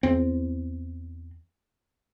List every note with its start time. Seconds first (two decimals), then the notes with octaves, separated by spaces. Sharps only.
0.03 E2 C4